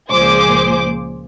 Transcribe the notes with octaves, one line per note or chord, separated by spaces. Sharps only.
C#2 A#2 F3 G#4 C5 D6